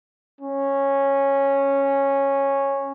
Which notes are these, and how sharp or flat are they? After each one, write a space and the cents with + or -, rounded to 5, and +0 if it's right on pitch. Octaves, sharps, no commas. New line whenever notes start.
C#4 -10